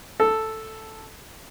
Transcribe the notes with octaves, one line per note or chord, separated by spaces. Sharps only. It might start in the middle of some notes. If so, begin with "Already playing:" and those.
A4